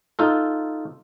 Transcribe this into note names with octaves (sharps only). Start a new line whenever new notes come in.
D#4 F4 A4